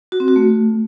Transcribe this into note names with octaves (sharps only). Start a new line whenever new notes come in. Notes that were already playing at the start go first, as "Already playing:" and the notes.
F#4
C4
F#4
A3